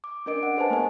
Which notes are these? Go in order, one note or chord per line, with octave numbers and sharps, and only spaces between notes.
D6
C#4 D4 A#4 D#5 D7
F#5
G#4 B4 C5 D#5 G#5 A5
A3 B3 A#4 G#5